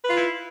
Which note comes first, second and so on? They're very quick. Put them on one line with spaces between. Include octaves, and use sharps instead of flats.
B4 F4 E4